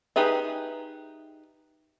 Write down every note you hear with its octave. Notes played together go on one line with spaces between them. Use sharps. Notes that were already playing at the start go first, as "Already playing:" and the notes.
D#4 G4 G#4 B4 E5